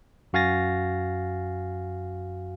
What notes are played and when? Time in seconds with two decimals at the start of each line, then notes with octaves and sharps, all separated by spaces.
0.33 F#2 F#4 F5 G#5 A6 A#6